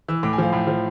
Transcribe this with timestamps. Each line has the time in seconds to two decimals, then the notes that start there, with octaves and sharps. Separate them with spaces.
0.08 E3 E6
0.23 A2 D6
0.33 G#5
0.38 F3 F5
0.53 A2
0.67 F3